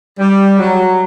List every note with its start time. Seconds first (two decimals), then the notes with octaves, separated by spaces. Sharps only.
0.19 G3
0.60 F#3